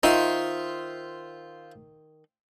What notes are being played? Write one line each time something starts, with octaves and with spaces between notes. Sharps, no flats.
D#3 F4 C5 E5